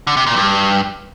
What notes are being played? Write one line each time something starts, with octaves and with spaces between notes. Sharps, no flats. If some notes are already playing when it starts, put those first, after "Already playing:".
D3
C3
A#2
G2